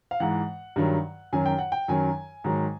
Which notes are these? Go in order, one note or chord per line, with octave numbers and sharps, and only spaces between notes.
F5
G#2 E3 F#5
G2 D#3 F#3
F#2 D#3 F#3 G#5
G5
F#5
G5
F#2 D#3 F#3 G#5
G#2 D#3 F#3